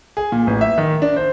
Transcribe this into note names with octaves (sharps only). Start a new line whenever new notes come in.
G#4
A#2
A1
E5
D#3
D4
C5